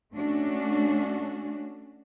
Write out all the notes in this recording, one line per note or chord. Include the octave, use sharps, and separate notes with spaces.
A3 C#4 D4 F#4